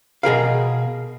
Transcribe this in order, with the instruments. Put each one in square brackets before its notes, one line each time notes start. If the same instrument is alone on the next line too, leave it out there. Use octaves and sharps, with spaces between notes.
[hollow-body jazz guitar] B2 G#4 A#4 F5